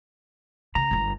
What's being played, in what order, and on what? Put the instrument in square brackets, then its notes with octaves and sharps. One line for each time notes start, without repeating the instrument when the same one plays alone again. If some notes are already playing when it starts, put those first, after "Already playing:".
[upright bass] C#3 [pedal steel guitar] A#5
[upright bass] G1 G2